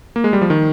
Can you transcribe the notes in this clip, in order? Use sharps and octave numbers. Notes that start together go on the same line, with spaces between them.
A#3
G#3
G3
F3
D#3